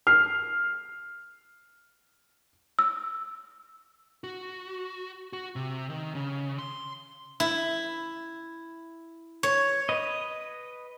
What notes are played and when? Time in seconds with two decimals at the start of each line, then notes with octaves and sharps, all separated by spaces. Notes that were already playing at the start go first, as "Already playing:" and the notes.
0.07 F6 C7
2.79 E6
4.24 F#4
5.33 F#4
5.56 C3
5.90 D#3
6.15 C#3
6.59 C6
7.40 E4
9.43 C#5
9.89 B4 D#5